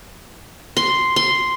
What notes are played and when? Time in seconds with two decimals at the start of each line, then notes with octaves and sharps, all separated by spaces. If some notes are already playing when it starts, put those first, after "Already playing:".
0.77 C6
1.16 C6